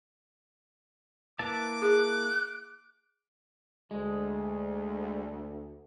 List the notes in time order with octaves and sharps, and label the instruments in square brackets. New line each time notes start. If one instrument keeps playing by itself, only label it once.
[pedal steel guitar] A#3 E4 A5 [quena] B4 [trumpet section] D6
[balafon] G#4 [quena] F#6
[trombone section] D2 [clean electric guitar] G#3